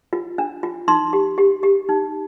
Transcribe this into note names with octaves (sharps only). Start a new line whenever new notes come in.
F4
D4
F4
D#4 C6
G4
G4
G4
D#4